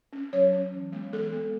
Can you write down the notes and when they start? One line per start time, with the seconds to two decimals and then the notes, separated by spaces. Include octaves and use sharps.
0.13 C#4
0.33 F#3 C#5
0.53 C#4
0.73 E3
0.92 G#3 B3
1.12 E3 A4
1.32 G#3 B3